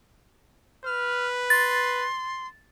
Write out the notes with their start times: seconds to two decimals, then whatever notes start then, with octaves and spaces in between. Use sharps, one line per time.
0.85 B4 F6
1.50 C6 A6